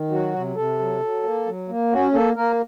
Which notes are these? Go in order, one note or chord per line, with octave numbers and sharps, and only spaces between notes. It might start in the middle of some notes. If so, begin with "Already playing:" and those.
Already playing: D#3
F#3 F#4
C3
C3 A4
F#3
F#3
A#3
F#3
A#3
C#4 F#4
A#3 A4
A#3 A#4